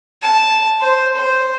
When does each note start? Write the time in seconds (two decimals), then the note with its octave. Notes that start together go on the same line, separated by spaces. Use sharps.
0.22 A5
0.80 C5
1.16 C5